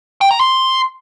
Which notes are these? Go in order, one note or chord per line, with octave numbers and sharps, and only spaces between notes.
G5
A#5
C6